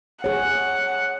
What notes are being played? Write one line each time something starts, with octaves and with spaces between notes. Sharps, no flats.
G#4 C#5 F#5